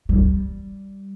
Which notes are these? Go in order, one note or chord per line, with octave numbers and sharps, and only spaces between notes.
G3